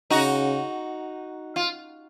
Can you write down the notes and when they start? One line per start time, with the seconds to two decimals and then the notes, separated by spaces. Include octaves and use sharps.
0.10 C#3 D#4 F#4
1.56 F4